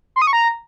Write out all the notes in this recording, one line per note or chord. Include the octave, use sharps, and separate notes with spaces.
C6
D#6
C#6
A#5